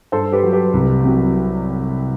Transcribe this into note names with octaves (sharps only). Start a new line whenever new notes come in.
G2 A4 C5
G4 B4
F#3
G4 B4
C2
C3 F#3